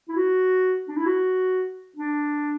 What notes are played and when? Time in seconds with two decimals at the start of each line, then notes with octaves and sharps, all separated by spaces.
0.09 E4
0.16 F#4
0.89 D4
0.97 E4
1.06 F#4
1.96 D4